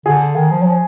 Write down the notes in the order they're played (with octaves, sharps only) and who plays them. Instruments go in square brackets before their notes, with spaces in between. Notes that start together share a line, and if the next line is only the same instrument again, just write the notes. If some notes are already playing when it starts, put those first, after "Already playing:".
[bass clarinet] D3 [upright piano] G#4
[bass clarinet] D#3
F3
F#3
F3